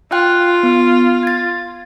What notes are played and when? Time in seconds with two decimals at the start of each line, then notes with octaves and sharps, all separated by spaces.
0.12 F4 G5 F#6
0.63 B3
1.23 G#6 A6